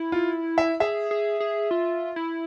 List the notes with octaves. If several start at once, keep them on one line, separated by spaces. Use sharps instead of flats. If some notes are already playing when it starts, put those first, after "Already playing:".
Already playing: E4
F4
E5
G#4 E5
G#4
G#4
F4
E4